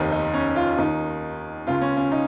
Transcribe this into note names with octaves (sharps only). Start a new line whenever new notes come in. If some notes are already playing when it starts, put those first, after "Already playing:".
Already playing: F1 D#2 D#3 D#4
D#4
C#4
F4
D#2 D#3 D#4
C#2 C#3 F4
C#4
C#4
D#4